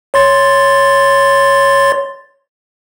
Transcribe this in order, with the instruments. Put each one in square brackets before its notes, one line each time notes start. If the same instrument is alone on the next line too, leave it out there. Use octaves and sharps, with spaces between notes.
[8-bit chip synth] C#5 C6 A6